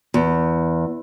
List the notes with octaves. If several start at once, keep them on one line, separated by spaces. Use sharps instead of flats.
E2